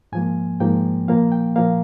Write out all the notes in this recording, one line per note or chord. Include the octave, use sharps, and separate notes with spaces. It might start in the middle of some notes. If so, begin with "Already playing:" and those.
G#2 F3 A#3 G#5
G#2 F3 A#3 G5
A#2 F3 A#3 F5
G5
A#2 F3 A#3 F5